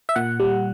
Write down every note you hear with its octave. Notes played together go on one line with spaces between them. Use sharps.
E5
A#2 F#5
G3